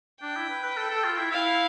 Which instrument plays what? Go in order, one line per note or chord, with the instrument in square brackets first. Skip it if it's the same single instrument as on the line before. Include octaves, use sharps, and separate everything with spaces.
[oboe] D4 [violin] G5
[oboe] E4
B4
B4
A4
A4
F4
E4
[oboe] E4 [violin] F5